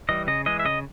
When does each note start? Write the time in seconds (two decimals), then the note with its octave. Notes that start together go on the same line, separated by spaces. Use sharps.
0.09 E3 G3 D#5
0.27 C#3 D#5
0.46 E3 G#3 D#5
0.59 E5
0.65 C#3 D#5